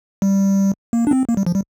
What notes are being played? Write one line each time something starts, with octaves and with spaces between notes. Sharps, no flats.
G3
A#3
D4
C4
A#3
G3
F3
G3